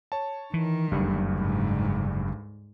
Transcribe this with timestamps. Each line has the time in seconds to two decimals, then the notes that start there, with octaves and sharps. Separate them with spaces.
0.12 C#5 A5
0.54 D#3 E3
0.92 F#1 D2 G2 C#3 G3
1.39 G#2